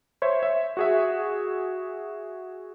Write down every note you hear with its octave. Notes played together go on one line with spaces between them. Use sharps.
C5 C#5 E5
E5
F#4 G#4 E5